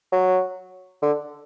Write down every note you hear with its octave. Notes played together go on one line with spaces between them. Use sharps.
F#3
D3